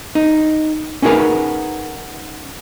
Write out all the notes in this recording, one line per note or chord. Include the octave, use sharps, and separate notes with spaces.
D#4
C#4 D#4 F#4 G#4 A#4 B4